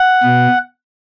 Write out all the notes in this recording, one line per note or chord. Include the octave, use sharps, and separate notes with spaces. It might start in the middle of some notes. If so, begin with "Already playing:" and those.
Already playing: F#5
B2